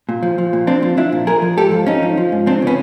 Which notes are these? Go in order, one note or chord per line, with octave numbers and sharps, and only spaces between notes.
A#2
F3
F3
A#2
A#2 C4 D4
F3
F3 D4 E4
A#2
F3 G#4 A#4
F3
G#2 G4 A4
F3
F3 C#4 D#4
F3
F3
G#2
C#3 C4 D4
C#3 B3 C#4